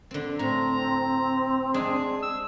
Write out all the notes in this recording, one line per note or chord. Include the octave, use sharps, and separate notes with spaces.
D3 C4
A2 C4 A#5
G#3 D4 G#4
E6